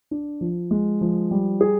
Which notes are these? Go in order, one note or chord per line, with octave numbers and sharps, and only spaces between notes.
D4
F3
G#3
F3
G3
G#4